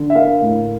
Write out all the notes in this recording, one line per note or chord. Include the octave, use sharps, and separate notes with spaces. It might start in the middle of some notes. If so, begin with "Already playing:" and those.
Already playing: D3
E5
A#3 F5
A2